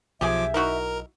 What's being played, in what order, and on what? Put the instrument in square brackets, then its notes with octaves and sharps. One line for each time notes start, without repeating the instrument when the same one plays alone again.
[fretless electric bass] B1 [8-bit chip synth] F3 D6 [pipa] G4 G#4 G#5 [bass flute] E5
[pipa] D#4 E4 F#4 [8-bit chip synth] A#4